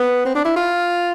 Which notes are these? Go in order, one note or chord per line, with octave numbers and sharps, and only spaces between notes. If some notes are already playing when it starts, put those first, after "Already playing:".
Already playing: B3
C4
D4
E4
F4